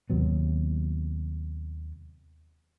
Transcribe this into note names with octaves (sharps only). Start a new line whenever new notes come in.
D#2 C3 F#3 B3